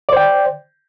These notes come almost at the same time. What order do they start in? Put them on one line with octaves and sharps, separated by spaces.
D5 C5 G5